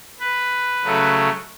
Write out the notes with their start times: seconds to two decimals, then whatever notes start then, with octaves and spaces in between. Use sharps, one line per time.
0.20 B4
0.84 C#3 F#3 A3